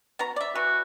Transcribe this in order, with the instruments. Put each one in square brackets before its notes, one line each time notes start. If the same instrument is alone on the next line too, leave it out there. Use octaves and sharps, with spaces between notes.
[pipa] B3 F#4 A#5
D5 E5
[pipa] E3 [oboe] F#4